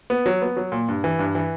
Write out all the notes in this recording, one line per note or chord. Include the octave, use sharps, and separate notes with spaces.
B3
F#3
B3
F#3
A#2
G2
E3
G2
E3